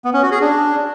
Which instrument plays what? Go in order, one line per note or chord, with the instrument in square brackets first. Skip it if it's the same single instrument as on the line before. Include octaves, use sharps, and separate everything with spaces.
[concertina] B3
C#4
F#4
G#4
D4